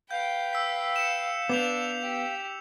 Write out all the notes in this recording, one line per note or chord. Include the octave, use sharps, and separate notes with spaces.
B4 F5 G5 G6
E6 B6
C#7 E7
B3 D4 D6 G6 F7
G4